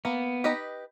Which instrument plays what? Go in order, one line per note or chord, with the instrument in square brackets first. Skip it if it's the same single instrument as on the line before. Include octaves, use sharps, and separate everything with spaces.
[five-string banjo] A#3 [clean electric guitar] B3
[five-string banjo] D#4 G4 B4 D#5